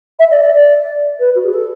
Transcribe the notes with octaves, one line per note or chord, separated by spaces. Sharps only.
E5
D5
D5
D5
B4
F#4
G#4
A4